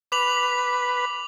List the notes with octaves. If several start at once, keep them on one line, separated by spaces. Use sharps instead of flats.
B4 D6 F7 F#7